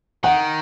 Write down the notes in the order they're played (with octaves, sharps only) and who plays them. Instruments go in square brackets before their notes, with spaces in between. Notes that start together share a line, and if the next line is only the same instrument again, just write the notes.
[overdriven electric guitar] D#3 [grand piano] F#5